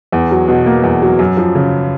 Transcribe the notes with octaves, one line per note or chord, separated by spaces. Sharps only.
E2
F#3
B2
A#3
E2
F#3
F#2
F3
C#3